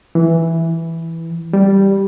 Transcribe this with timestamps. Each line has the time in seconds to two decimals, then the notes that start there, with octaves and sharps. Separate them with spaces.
0.15 E3
1.53 G3